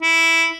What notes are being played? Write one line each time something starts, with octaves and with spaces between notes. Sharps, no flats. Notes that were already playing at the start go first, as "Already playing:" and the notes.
E4